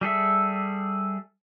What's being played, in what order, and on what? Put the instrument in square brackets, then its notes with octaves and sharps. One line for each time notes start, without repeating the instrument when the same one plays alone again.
[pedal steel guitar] G3 G#4 A4 E5